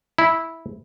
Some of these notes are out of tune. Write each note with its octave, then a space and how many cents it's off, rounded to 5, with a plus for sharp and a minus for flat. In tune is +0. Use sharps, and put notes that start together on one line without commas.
E4 -10